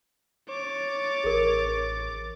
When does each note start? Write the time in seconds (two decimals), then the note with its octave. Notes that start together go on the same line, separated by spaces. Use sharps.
0.49 C#5 D6 A6
1.24 A1 G#4 A#4